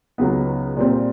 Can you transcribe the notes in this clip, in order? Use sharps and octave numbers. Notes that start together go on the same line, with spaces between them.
C#2 C#3 F#3 B3 D#4
A#2 G3 C4